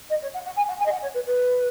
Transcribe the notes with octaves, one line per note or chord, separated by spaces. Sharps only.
D#5
C#5
F#5
F#5
G#5
F#5
G#5
D#5
F#5
C#5
B4
B4